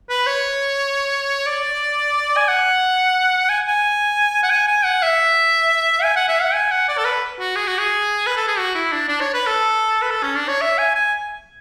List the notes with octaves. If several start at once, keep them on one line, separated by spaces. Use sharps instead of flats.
B4
C#5
D5
G#5
F#5
G#5
G#5
F#5
G#5
G#5
F#5
E5
G#5
F#5
E5
F#5
G#5
F#5
D5
A4
B4
F#4
G#4
F#4
G#4
B4
A4
G#4
F#4
E4
D4
D4
C#5
B4
A4
B4
A4
C#4
D4
C#5
E5
G#5
G#5